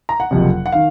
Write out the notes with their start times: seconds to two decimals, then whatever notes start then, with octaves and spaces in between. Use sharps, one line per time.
0.09 A#5
0.20 F#5
0.31 F#1 F2 C3
0.66 F#5
0.72 D#3 F5